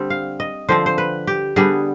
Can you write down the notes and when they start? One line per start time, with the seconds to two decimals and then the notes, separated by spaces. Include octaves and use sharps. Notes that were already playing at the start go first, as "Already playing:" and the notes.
Already playing: D3 G3 C4
0.10 F5
0.40 D#5
0.69 D3 F3 C4 C5
0.86 C5
0.98 B4
1.27 G4
1.56 D3 G3 B3 G#4